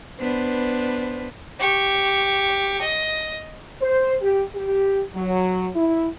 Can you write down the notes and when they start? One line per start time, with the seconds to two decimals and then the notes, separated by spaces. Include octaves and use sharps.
0.19 B3 D4 B4 C5
1.59 G4 C#6
2.81 D#5
3.81 C5
4.21 G4
4.55 G4
5.15 F#3
5.75 E4